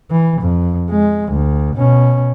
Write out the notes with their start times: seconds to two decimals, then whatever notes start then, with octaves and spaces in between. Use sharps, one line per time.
0.11 E3
0.42 F2
0.91 G#3
1.32 D2
1.76 B2 C#4